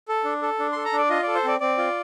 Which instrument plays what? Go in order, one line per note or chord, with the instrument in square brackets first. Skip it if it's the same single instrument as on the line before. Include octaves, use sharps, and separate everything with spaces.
[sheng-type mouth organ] A4
D4
A4
D4
A4 C6
A#5
D4 D5
F4 D#5
A4 D5
C5
C4 D5
C4 D5
F4